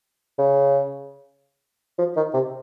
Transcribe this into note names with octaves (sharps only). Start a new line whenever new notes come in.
C#3
F3
D#3
C3